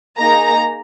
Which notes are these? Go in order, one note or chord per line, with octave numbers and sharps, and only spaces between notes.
A#3 D#4 G#4 A#5